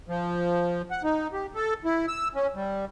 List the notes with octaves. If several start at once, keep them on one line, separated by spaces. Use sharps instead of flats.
F3
F#5
D#4
G4
A4
E4
E6
C#4
G3